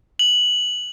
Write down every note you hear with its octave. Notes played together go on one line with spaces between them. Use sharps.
F#7